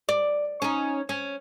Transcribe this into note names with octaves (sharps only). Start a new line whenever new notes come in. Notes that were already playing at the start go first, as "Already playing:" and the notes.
D5
C#4 D#4
C#4